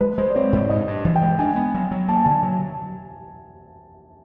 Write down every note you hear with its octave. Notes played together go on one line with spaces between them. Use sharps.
G#3 B4
G#3 C5
D5
C4 C#5
G#2 D5
G2 D#5
G2
E3
G5
G#3
D4 G#5
B3
F#3
F#3
A#3 A5
G#5
D3 A5
F#3